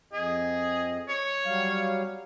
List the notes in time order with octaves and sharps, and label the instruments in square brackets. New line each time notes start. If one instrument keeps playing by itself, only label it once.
[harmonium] F2 D#5 [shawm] G#4
[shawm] C#5
[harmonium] F#3 G3 F5